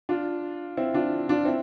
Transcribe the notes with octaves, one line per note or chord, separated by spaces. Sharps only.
D4 F4
C4 E4
D4 F4
D4 F4
C4 E4